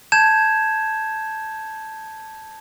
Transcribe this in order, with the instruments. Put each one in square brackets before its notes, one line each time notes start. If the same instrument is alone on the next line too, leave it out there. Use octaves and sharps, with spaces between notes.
[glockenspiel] A5 G6 G#6 E7